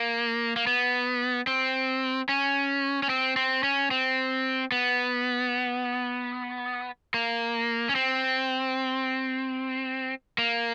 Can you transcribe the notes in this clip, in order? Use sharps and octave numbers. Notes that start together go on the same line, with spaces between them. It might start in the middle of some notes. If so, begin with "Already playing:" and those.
Already playing: A#3
A#3
B3
C4
C#4
C#4
C4
C4
C#4
C4
B3
A#3
C#4
C4
A#3